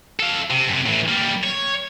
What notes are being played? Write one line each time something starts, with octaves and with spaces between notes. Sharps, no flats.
A4 F5
C3
F#2 C3
A2 E3
G3 A#3
C#5